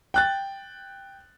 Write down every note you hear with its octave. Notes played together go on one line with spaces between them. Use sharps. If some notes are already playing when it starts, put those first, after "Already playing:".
G5 F#6 A6